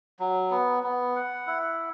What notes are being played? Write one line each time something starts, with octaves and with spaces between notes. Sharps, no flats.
F#3
B3
B3
F#5
E4